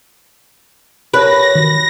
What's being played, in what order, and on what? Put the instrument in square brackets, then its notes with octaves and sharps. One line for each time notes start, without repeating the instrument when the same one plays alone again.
[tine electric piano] G4 A#4 C#5 [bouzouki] B4 [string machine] A#6
[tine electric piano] D#3 F#4